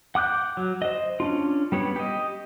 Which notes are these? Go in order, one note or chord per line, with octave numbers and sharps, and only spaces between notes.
F#5 D6 F#6 G6
F#3
C5 D#5
C#4 D4 F4
G3 B3 C#5
G4 D#5